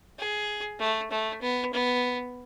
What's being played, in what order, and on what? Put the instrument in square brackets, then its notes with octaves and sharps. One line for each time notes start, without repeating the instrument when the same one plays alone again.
[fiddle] G#4
A3
A3
B3
B3